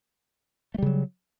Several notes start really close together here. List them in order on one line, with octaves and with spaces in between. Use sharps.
A3 G3 C#3 F#3